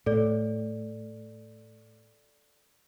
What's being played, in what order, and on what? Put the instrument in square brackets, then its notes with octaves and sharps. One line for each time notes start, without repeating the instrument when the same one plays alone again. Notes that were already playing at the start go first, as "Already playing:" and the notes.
[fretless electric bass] A2 [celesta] A4 D5